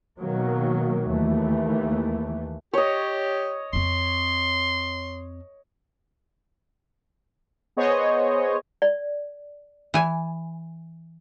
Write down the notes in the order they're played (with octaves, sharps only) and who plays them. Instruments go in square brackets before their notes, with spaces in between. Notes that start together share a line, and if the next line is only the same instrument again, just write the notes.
[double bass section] B2 D#3 F#3 A#3
D#2 E3 A3
[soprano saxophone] G4 [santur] C#5 D#5
[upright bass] F2 C4 [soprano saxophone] C6
[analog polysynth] B3 G#4 C5 C#5 D#5
[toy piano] D5
[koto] E3 G#5